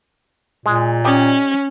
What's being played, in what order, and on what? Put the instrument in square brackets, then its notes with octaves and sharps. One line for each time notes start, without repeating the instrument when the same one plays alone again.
[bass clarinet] A#2 [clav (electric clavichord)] G#3
[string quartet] C#4 [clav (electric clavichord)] D#4 G4 D5